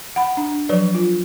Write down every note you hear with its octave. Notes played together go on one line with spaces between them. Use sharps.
F#5 B5
D4
F3 F#3 B4 D5
F4